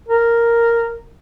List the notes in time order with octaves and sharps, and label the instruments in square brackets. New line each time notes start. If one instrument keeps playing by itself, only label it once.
[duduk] A#4